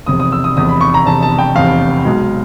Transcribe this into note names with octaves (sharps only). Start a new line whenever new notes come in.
F1 E2 C3 D#6
D#6
E6
D#6
F1 E2 C3 D#6
B5
C#6
A#5
F1 E2 C3 A5
A5
G5
F1 E2 C3 F5
B1 B2 G#3